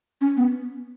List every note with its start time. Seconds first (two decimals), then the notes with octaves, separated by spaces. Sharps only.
0.21 C#4
0.37 B3